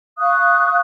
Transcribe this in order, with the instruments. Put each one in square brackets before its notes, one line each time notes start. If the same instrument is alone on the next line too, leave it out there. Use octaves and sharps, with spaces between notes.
[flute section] F5 C#6 D#6 F#6